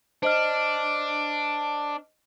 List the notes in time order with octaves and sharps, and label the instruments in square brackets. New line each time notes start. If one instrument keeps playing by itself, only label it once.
[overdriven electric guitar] D4 [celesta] C5 D#5 F6